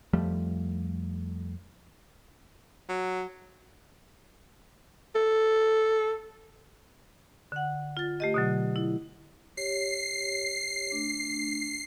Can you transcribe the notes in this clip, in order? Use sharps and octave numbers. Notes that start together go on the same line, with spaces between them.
F2 F3 G3 A3
F#3
A4
D3 F#5
F4 A6
A3 G4 D#5
B2 D3 F#3
E4
G4 C#5 C7
A3 D4